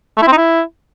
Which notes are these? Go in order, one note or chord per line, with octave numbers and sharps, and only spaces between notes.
A3
E4
C4
D#4
E4